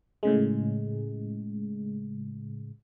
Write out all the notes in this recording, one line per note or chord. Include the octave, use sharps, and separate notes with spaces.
A2 C#3 G#3